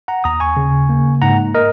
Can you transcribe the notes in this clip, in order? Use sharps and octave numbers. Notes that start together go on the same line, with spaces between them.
F#5 A#5
D#2 A#5 D#6
G#5 C#6
C#3
A#3
G#2 F#5 A#5
A#4 D#5